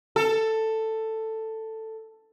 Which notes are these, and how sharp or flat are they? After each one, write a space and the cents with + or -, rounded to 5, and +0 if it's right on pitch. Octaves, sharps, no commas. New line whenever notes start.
A4 +10